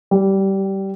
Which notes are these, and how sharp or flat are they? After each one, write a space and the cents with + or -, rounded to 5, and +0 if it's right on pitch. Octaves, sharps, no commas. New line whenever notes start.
G3 -15